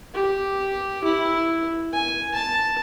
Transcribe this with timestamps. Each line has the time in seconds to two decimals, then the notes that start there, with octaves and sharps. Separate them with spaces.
0.14 G4
1.04 E4
1.93 G#5
2.35 A5